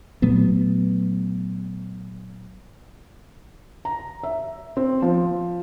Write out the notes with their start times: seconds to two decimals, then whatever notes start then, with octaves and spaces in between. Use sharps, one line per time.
0.22 A#2 F#3 A3 B3
3.85 A#5
4.23 E5
4.77 C4
5.02 F3